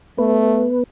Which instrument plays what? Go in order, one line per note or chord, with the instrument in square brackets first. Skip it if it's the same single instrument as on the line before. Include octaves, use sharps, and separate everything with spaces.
[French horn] A3 [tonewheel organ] B3 B4